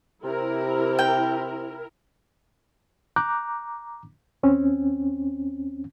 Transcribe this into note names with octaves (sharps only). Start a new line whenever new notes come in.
C3 E4 A#4
G5
A#5 D6 F#6 G6
D#2 C4 C#4